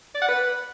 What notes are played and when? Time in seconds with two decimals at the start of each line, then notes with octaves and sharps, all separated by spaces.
0.15 D5
0.21 F#5
0.28 B4